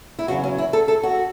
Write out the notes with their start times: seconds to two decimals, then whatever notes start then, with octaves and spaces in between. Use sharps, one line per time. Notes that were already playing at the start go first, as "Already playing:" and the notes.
0.19 E4
0.28 E2 C#3 F#3 F#4
0.44 C#4
0.58 E4
0.73 A4
0.88 A4
1.03 F#4